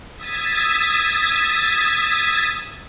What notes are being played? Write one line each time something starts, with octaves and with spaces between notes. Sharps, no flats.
D#6 E6 G#6 A6 B6